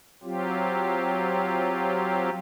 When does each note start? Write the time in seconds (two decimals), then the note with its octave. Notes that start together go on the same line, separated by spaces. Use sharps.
0.23 F#3 C4 F4 G4